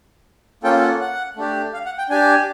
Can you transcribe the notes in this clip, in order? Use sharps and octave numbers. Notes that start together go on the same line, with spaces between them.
A#3 C#4 F4 A4 G5
F#5
F#5
A3 D4 G4
F5
F#5
G5
D4 G4 G#5